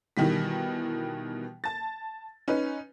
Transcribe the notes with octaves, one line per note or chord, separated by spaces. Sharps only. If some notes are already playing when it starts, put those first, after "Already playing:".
B2 D#3 E3 G3 B6
A5 A6
C#4 D#4 B4